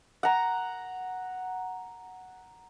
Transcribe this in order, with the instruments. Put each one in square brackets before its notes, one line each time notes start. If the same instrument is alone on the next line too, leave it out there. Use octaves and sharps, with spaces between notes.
[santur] F#5 A#5